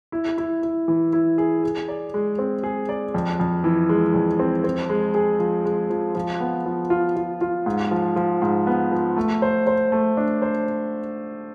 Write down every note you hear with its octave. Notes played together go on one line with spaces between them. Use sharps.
E4
E4
E4
E3
E4
G#4
G#4
D5
G#3
C4
G#4
D5
F2
F2
E3
G#3
F2
C4
C4
G#3
G#4
F3
G#3
F3
F3
B3
F3
F4
F4
F4
G#2
F3
F3
G#2
B3
F3
A3
C5
C5
A3
D4
C5